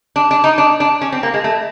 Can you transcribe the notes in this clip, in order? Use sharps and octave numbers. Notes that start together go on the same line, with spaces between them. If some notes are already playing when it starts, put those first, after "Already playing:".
D4
D4
D#4
D4
D4
C#4
C4
A#3
G#3
A3